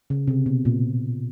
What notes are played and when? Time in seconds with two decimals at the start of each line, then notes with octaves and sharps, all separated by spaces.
0.10 C#3
0.28 C3
0.46 B2
0.65 A#2